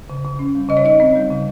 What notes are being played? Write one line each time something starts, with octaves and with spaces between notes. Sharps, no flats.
C#3
C#3
C#4
G3
C#3 D#5
C#5
D#4 D#5
C4
G3
C#3